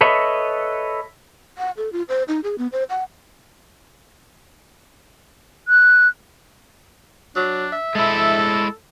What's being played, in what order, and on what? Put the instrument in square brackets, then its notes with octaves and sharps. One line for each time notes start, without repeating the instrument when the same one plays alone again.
[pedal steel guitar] A4 B4 C#5 D#5 E5
[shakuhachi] F#5
A4
F4
C5
D#4
G#4
B3
C5
F#5
[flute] F#6
[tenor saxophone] F#3 [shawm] D4
[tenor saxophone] E5
[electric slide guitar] G#3 E4 [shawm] A4